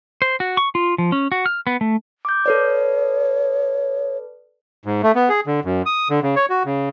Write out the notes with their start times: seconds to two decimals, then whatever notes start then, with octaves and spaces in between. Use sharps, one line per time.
0.22 C5
0.40 F#4
0.57 C#6
0.75 F4
0.98 F3
1.12 C#4
1.32 F#4
1.46 F6
1.67 B3
1.81 A3
2.25 D6 G6
2.46 A4 B4 C#5 D5
4.85 G#2
5.03 A3
5.15 B3
5.29 G#4
5.46 D3
5.65 F#2
5.86 D#6
6.10 D3
6.22 C#3
6.36 C#5
6.50 F#4
6.65 C#3